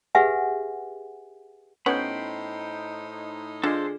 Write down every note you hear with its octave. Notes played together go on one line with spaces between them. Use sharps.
G4 G#4 B4 E5 F#5 G#5
A2 B3 C#4 D#4 F#4 C5 G5 B5
D3 G#3 D4 F4 G#4 A4 C5